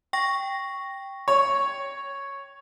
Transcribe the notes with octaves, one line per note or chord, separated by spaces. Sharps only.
G5 C#6 A#6
C#5